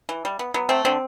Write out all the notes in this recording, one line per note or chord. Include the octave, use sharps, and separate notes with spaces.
E3
G3
B3
F#3 B3
A3 C4
D3 C4